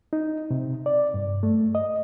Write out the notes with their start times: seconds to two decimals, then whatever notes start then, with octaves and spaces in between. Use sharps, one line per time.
0.13 D#4
0.51 C3
0.86 D5
1.14 G2
1.43 A3
1.75 D#5